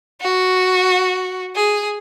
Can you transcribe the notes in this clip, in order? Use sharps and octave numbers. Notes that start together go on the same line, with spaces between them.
F#4
G#4